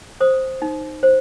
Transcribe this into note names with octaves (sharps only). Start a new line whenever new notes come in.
C5 D#6
D#4
C5